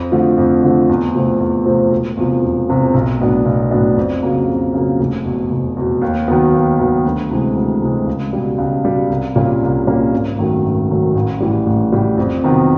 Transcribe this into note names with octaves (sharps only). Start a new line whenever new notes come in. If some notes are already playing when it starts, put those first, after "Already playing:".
Already playing: F2
D3 F3 A3
F2
D3 F3 A3
E2
C3 F3 A3 C4
E2
C3 F3 A3 C4
E1
E2 C3 F3
E1
E2 C3 F3
B1
A2 F#3 B3 D4
B1
A2 F#3 B3 D4
F2
C#3 F#3 A#3
F2
C#3 F#3 A#3
F1
E2 B2
F1
E2 B2
D#2
D#3 F#3 B3
D#2
D#3 F#3 B3
D2
C3 E3 G#3
D2
C3 E3 G#3
C#2
B2 G3
C#2
B2 G3
C2
A#2 G3 A#3 C#4
C2
A#2 G3 A#3 C#4
G#1
F#2 D#3 F#3 A3
G#1
F#2 D#3 F#3 A3
A1
A2 E3 G3
A1
A2 E3 G3
F2
C3 D#3 F#3 B3